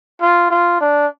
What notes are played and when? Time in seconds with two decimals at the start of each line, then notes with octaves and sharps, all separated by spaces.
0.21 F4
0.50 F4
0.80 D4